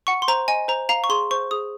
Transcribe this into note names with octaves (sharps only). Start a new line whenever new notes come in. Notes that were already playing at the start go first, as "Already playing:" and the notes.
F#5 C#6
C6
C5 A#5
D#5 G#5
C5 A#5
F5 A#5
C#6
G#4 C6
C5 C#6
G#4 D#6